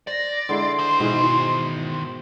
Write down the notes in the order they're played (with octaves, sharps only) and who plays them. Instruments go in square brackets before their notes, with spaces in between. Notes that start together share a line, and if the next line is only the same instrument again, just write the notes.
[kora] C5 [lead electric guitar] D5 [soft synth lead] A#6
[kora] D3 G#3 E4 [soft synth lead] C6
[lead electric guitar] D#3 C5
[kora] G#2 B2 E3
E3